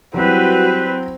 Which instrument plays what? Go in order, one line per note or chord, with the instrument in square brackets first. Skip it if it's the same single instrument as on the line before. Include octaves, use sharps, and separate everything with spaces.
[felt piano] F#3 E4 [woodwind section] G3 B4 [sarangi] C4 [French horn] F#4